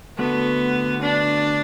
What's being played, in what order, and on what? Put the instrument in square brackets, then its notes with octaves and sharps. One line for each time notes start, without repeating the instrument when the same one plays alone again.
[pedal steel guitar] D3 A3 F#4 [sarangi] B3
[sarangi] D4